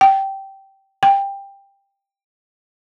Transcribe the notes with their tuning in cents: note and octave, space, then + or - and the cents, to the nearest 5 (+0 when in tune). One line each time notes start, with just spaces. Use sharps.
G5 -10
G5 +15